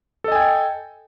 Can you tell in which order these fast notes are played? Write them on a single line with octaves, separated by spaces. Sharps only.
A4 D#5 G#5 G5